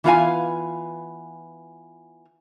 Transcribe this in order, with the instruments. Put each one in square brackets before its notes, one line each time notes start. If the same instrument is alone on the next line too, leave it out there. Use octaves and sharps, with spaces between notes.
[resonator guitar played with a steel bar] E3 B3 F4 C5 F5 G#5